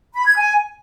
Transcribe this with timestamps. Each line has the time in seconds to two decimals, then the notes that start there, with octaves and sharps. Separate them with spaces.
0.14 B5
0.25 G#6
0.37 G#5